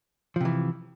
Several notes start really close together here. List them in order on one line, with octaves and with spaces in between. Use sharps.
F3 C3 E3